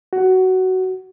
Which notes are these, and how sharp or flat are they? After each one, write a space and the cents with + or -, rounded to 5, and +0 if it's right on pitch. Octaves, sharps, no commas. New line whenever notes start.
F#4 +15